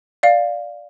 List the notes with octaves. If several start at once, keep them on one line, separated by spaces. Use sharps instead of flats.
D5 F5